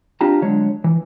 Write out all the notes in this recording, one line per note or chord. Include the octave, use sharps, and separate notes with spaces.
C4 D4 F4 G4 A5 A#5
D3 F#3 G#3 C#5
E3